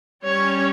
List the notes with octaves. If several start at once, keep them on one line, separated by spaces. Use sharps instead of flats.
G3 C#4 C#5